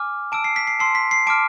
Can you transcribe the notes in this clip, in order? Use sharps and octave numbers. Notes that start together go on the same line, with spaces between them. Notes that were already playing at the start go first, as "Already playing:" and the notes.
Already playing: G#5 D6 F6
A5 E6 D7
C7
B6
C7
A5 C6 E6 C7
B6
C7
A5 D6 F6 D7